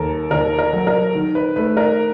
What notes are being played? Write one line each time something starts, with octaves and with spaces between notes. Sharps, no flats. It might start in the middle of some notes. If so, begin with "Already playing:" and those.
Already playing: D#2 A4 A#4
D#2 A#4
A#4
F#3
A#4
D#3
B4
A3 B4
A#4